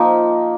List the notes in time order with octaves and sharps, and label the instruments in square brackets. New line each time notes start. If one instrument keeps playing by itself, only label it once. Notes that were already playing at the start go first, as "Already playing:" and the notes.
Already playing: [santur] F3 A#3 D#4